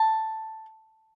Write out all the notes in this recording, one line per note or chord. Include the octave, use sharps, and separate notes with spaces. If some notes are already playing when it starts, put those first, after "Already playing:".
Already playing: A5